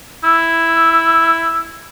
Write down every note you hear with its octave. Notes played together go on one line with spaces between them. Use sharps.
E4 E6